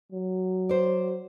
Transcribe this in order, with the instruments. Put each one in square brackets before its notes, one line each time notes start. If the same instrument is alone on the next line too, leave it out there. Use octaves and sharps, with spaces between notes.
[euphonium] F#3
[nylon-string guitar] C5 D5